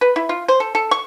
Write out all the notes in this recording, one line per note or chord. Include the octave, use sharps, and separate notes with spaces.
B4
E4
F4
C5
A4
A4
C#6